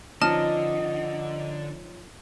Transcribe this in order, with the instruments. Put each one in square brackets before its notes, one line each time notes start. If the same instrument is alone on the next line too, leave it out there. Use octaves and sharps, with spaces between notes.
[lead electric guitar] D3 [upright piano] F3 C#4 D#4 [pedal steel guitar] D#5 [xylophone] A5 F6